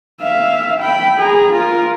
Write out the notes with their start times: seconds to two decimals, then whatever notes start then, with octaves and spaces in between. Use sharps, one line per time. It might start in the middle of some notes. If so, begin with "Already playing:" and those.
0.22 E5 F5
0.80 G5 B5
1.19 G#4 A#5
1.53 F4 A#4